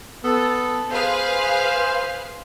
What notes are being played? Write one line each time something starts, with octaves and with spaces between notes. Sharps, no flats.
B3 A4
G#4 B4 C5 F5